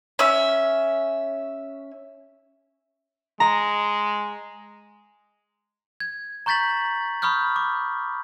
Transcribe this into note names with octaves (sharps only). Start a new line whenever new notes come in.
C#4 E5
G#3 A#5
G#6
A#5 C#6 G6 A6 B6 F#7
B5 C#6 D#6 F6 G6
D6